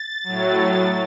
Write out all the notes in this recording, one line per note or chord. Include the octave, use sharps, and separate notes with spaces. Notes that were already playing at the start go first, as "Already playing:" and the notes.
Already playing: A6
A2 F#3